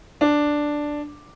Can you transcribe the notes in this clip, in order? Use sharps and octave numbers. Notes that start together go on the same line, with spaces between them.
D4